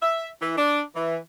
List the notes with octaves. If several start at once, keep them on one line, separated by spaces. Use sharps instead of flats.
E5
E3
D4
E3